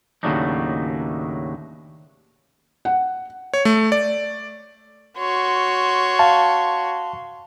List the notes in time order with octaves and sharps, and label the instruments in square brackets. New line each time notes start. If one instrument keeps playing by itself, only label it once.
[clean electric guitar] D#2 A2 C#3 F#3 D4 D#4
[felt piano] F#5
[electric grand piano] C#5
A3
D5
[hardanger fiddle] F#4 C#5 [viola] C6
[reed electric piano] F5 A5